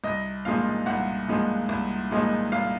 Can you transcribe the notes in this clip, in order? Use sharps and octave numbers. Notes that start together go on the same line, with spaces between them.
C2 D#5
A#2 F3 G#3 D#4 F5
C2 F#5
A#2 F3 G#3 D#4
C2
A#2 F3 G#3 D#4
C2 F5